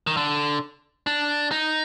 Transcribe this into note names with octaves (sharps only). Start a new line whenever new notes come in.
D#3
D3
D4
D#4